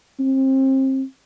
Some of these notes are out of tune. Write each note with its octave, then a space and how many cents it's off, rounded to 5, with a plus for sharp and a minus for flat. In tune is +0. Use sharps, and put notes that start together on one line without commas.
C4 +30